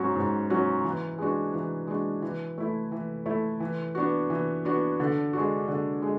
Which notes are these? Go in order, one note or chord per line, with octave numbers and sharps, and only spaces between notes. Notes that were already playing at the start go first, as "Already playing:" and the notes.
Already playing: G#2 F#3 C#4 F#4
G#2
F#3 C#4 F#4
E3
G#3 D4 F#4
E3
G#3 D4 F#4
E3
A3 E4
E3
A3 E4
E3
B3 D4 F#4
E3
B3 D4 F#4
D3
G#3 D4 F#4
D3
G#3